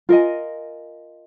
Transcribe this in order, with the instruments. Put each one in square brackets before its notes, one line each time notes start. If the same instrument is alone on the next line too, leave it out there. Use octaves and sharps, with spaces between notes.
[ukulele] F4 A#4 D#5 G#5